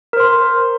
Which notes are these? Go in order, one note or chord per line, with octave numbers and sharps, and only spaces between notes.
A#4 C5 C6